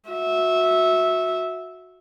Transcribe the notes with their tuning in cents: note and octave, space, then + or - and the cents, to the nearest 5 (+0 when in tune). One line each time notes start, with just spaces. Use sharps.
F#4 -20 E5 -15